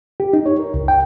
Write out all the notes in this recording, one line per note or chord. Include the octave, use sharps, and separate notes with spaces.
G4
D#4
C#5
A#4
C#2
G5